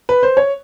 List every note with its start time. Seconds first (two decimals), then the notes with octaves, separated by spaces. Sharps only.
0.09 B4
0.23 C5
0.37 C#5